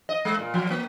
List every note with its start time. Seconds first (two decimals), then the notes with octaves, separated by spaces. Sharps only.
0.09 D#5
0.25 G#3
0.39 A#2
0.54 F3
0.71 A#3